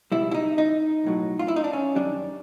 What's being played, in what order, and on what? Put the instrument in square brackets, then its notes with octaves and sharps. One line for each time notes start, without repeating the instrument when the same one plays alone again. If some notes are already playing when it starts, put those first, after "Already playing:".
[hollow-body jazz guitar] C#2 B2 G3 E4
E4
D#4
D#4
B1 A2 F#3
F4
E4
D#4
D4
C#4
F#2 D#3 G3 D4